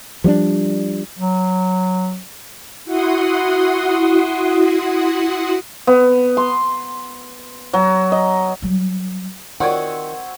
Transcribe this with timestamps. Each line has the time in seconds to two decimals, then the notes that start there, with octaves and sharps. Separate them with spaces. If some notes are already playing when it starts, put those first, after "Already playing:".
0.24 F3 G3 C4 D4
1.19 F#3
2.85 E4 F#4 F#5 C6 D#6
5.87 B3
6.37 C6
7.73 F#3
8.12 D#5
8.62 F#3 G3
9.60 D#3 C4 F4 F#4 C#5 D5 F#5 G#5